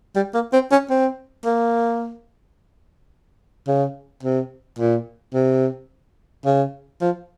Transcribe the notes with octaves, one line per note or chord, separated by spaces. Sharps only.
G3
A#3
C4
C#4
C4
A#3
C#3
C3
A#2
C3
C#3
F3